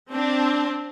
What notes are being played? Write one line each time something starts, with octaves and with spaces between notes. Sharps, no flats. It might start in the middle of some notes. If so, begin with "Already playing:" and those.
C4 D4